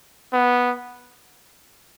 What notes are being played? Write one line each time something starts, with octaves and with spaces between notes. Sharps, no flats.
B3